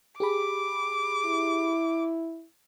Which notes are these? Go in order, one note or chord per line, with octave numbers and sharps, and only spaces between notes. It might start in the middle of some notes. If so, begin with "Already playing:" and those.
G4 G#4 B5 D6
E4